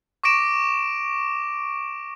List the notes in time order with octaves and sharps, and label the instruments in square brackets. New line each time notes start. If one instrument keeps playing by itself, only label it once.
[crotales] C#6 D6 A#6 D7 E7